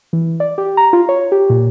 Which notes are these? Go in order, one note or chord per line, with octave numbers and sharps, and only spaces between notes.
E3
D5
G4
A#5
F4
C#5
G4
A#2